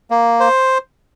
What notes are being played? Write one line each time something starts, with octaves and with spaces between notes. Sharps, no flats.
A#3
C5